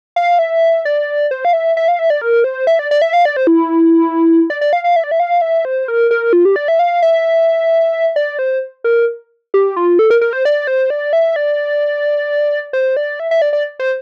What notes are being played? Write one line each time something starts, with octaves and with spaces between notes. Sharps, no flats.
F5
E5
D5
C5
F5
E5
E5
F5
E5
D5
A#4
C5
E5
D5
D5
E5
F5
D5
C5
E4
D5
D5
F5
F5
E5
D5
E5
F5
E5
C5
A#4
A#4
F4
G4
D5
E5
F5
E5
D5
C5
A#4
G4
F4
A4
A#4
A#4
C5
D5
C5
D5
E5
D5
C5
D5
E5
E5
D5
D5
C5